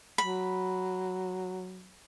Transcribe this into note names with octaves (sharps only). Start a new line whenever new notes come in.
F#3 B5